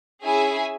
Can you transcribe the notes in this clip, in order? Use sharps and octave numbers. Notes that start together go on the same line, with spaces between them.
C#4 E4 G#4 E5 G#5